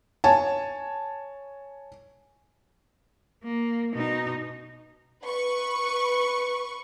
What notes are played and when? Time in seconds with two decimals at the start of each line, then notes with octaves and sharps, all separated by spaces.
0.24 C#5 G#5 A5
3.44 A#3
3.94 B2 D#4
5.24 B4 C#6